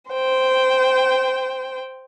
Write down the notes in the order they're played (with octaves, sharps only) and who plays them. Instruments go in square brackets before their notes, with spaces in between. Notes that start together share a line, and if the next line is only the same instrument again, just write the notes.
[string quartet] C5 G5